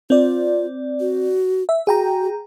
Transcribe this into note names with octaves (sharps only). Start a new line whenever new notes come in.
C4 F4 D5
F#4
E5
F#4 G#4 G5 A#5